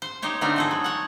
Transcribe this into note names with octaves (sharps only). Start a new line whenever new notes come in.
C5
D#4 G4 C5 C#5
D3 A3 C4 D#4 A#4
G#4 A4 D#5
F#3
C#5 F#5